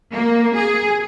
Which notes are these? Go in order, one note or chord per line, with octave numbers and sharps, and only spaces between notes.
A#3
G#4